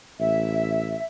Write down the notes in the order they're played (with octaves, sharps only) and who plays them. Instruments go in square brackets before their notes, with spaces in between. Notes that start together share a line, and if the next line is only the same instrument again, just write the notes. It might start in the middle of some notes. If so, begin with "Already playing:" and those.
[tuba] A1 [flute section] E5